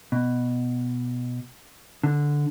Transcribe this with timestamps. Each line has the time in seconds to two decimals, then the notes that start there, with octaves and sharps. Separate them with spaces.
0.12 B2
2.04 D3